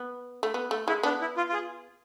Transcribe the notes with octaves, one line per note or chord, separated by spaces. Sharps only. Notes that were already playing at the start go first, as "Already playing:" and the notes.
Already playing: B3
A3
B3
A3
G#3 E4
B3 D4
E4
F4
F4
G#4